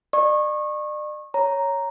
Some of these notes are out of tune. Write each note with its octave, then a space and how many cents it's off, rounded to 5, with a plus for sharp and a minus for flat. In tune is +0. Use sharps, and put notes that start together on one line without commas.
D5 +40 C#6 -25
C#5 +0 A#5 +0